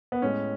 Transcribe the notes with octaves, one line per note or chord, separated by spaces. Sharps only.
B3
A2 G#3 C#4